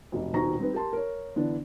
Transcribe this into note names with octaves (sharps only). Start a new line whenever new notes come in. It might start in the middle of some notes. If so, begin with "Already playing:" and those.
F1 B1
D#1 B2 D#3 A#5 C#6 A#6
G3 C4 D#4 B4
G4 A#4 A5 C6
A#4 C#5
D3 E3 B3 D4